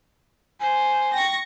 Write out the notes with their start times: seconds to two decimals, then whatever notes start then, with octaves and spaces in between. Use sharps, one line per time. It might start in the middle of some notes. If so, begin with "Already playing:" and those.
0.60 C5 G#5
1.13 G5 C#6 A#6